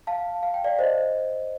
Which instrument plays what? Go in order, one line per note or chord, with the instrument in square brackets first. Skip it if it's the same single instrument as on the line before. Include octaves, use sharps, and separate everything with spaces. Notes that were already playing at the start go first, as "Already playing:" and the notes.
[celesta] F5 A5
F5
G5
D5 F5
C5 D#5